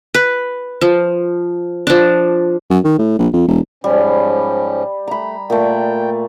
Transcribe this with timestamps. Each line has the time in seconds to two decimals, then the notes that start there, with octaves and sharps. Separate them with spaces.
0.14 B4
0.81 F3
1.87 F3 D4
2.70 F#2
2.85 D#3
2.99 A2
3.19 A#1
3.33 F2
3.48 E1
3.84 G#2 F3 G3 C#4
5.07 A3 A#5 B5
5.50 A#2 A3 G5